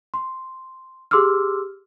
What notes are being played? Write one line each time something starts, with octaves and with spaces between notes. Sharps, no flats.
C6
G4 G#4 C6 D6 E6 F6